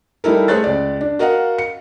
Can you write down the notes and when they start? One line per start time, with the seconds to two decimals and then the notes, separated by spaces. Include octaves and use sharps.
0.24 G3 D#4 E4 A4 A#4
0.48 A3 G#4 C5 C#5 F#6 A6
0.64 C#2 D5
1.01 D4
1.19 F#4 A#4 D#5 F5 F#5
1.58 C#7